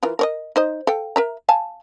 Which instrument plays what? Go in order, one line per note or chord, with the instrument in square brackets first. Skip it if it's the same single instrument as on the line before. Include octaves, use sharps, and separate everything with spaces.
[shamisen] E3 F4 A#4
A#4 C#5 D#5
D#4 C5 D#5
A4 F5 G5
A#4 E5 A#5
F5 G#5 A5